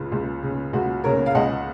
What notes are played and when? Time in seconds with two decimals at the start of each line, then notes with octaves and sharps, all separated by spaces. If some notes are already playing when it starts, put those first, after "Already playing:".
Already playing: C#2 C#3 F4
0.12 C#2
0.43 C#3
0.73 C#2 F#4
1.04 C#3 A#4 C#5
1.26 F5
1.35 C#2 D#5 F#5